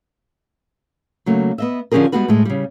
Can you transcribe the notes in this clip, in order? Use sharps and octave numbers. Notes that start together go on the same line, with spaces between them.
C#3 F#3 A3 A#3
B3 D#5 E5
D3 F3 C#4 G4 G#4 A#4
G3 G#3 B3 F4 F#4 B4
A2 G3 G#3
C#3 G3